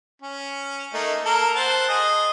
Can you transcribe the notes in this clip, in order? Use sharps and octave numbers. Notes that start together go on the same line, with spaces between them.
C#4
A3 A#3 D#4
A#3 A4 A#4
C5 F#5 A5
G#4 D#5